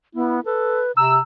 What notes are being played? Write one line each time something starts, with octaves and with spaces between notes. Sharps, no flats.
B3 E4
A4 B4
C3 A#5 E6